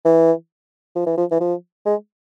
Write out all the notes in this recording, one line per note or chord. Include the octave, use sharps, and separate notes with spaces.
E3
F3
E3
F3
E3
F3
G#3